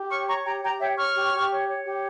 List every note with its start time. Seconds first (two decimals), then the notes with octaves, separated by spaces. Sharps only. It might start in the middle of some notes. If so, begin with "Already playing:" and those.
Already playing: G4
0.10 C#5 C#6 F6
0.28 C#5 A#5 C#6
0.45 G4 G5 A#5
0.63 G4 G5 A#5
0.80 C#5 E5 G5
0.98 C#5 C#6 F6
1.15 G4
1.33 G4
1.51 C#5
1.68 C#5
1.85 G4